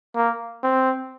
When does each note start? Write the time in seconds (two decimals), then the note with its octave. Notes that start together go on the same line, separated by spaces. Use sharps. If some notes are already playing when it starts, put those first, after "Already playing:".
0.16 A#3
0.63 C4